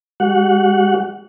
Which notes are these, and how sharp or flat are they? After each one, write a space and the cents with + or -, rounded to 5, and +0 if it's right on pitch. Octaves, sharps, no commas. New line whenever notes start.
G#3 -40 F#4 +40 F#5 -10